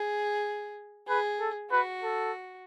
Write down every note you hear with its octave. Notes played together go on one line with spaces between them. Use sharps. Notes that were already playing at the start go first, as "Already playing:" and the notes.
Already playing: G#4
G#4 B4
A4
F#4 B4
A4